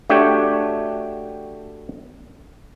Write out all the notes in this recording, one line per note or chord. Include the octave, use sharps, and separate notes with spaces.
A3 D4 F#4 G4 C#5 G5